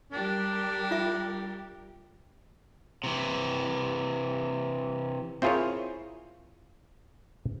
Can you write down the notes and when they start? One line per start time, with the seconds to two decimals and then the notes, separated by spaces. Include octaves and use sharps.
0.12 G3 D4 G4 A#4
0.91 F4 E5
3.04 C3 E3
5.42 C4 E4 F4 G#4 A#4 C#5